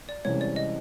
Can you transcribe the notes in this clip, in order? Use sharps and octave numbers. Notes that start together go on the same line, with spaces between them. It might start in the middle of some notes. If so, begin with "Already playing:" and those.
D5
C2 C3 E3 G#3 C#4 C#5
D5
D#5